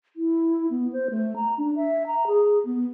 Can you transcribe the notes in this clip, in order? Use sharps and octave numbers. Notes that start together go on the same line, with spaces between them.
E4
B3
C5
A3
A#5
D4
E5
A#5
G#4
B3